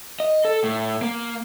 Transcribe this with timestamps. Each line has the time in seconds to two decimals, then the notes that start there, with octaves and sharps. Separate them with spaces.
0.20 D#5
0.45 A4
0.64 A2
1.02 A#3